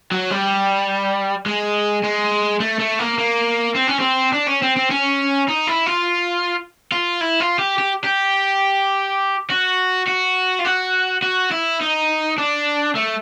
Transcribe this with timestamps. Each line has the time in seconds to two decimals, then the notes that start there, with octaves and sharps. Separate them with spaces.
0.12 F#3
0.30 G3
1.46 G#3
2.03 G#3
2.60 A3
2.79 A3
2.99 A#3
3.18 A#3
3.76 C4
3.89 C#4
4.01 C4
4.33 D4
4.48 C#4
4.62 C4
4.77 C4
4.91 C#4
5.48 D#4
5.67 E4
5.86 F4
6.92 F4
7.21 E4
7.40 F4
7.59 G4
7.78 G4
8.04 G4
9.50 F#4
10.08 F#4
10.60 F4
10.65 F#4
11.22 F#4
11.51 E4
11.80 D#4
12.38 D4
12.96 A3